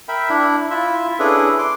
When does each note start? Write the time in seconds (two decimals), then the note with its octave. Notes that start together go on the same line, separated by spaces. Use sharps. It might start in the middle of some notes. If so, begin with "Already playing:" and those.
0.08 A#4 E5 G5 B5
0.29 D4 E4
0.71 E4 F4 E5
1.19 C#4 D4 E4 G#4 A4 B4
1.58 C6 D6